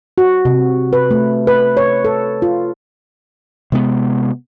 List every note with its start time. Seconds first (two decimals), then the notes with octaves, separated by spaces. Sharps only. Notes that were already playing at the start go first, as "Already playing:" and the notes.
0.18 F#4
0.45 C3
0.93 B4
1.11 A3
1.47 B4
1.77 C#5
2.04 A4
2.42 F4
3.72 C3 G#3 B3